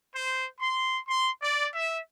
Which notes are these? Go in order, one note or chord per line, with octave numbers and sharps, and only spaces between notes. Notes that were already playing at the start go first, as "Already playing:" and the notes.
C5
C6
C6
D5
E5